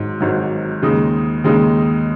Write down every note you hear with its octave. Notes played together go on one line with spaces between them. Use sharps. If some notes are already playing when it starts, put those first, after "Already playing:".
Already playing: G#1 G#2 F#3
G#1 G#2 F#3
D#2 C#3 G#3 D#4
D#2 C#3 G#3 D#4